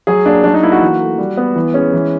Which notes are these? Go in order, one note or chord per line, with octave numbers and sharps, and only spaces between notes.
F#3 G#4
A#3 D4
F#3 D4
D#4
A#3 E4
F#4
E3
A3
G3
B3
E3
G#3 C#4
E3